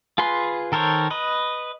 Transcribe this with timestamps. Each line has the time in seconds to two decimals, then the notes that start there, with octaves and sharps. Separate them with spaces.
0.18 F4 G#4 B4 C6
0.72 D#3 A4 A#4 C5 C#5
1.11 B4 D#5